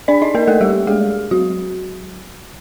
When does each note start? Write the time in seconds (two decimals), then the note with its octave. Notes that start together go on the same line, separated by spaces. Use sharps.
0.08 D4 D5
0.22 D#4 D#5
0.35 A#3 A#4
0.47 A3 A4
0.61 G3 G4
0.87 G#3 G#4
1.31 F#3 F#4